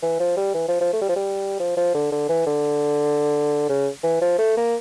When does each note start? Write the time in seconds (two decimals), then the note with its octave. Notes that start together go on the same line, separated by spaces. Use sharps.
0.03 E3
0.20 F3
0.37 G3
0.54 E3
0.68 F3
0.81 F3
0.93 A3
1.01 G3
1.09 F3
1.16 G3
1.59 F3
1.77 F3
1.94 D3
2.12 D3
2.29 E3
2.46 D3
3.69 C#3
4.03 E3
4.21 F3
4.38 A3
4.57 A#3